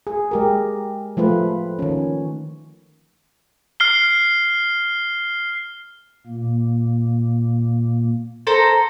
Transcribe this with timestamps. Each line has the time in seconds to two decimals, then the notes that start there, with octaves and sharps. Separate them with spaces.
0.07 G#4
0.31 G#3 G4 A#4
1.17 F3 A3 F4 B4
1.79 D#3 C#4
3.80 F6 C7 G7
6.27 A#2 A#3
8.47 A4 C5 A#5